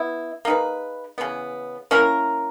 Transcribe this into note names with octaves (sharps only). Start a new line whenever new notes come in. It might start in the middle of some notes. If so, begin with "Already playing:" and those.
Already playing: B3 E4
A#3 D#4 G#4 B4
C#3 E3 B3
A#3 C#4 E4 A#4